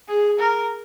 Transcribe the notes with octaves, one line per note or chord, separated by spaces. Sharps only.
G#4
A#4